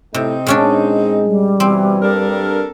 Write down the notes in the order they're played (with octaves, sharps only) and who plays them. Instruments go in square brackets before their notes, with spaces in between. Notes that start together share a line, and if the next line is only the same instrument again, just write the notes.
[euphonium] A2 [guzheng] C3 [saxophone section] C4 D#4
[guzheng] A#2 C#4 D4 [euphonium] G#3
[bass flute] G3
[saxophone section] B2 E3 [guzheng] C4
[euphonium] G2 [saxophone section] D4 A4 A#4